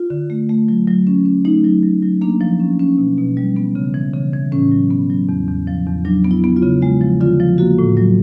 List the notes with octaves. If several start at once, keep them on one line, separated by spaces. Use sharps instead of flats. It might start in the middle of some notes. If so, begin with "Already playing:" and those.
Already playing: F4
D3
A3
A3
F#3
F#3
C#4
C#4
A3 D#4
F#3
F#3
F#3
A#3 D4
F3
C#4
C#4
B2
B2
G3
B3
C#3
E3
C#3
E3
A2 C#4
F#3
B3
F#3
E2
E2
F3
E2
F#3 D4
B3
E4
B3
F4
C#3
G#3 F4
F3
D3 F4
F3
A#3 F#4
A2
F#3